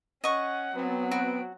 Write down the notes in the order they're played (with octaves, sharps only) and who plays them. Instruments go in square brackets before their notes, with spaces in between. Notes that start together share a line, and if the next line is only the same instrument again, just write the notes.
[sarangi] C#4 [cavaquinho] D#5 C#6 [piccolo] F#5
[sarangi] F#3 [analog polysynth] B3 C4
[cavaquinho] F#4 [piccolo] D7